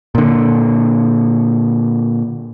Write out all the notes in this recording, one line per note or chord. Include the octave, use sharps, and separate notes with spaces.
A#2 D3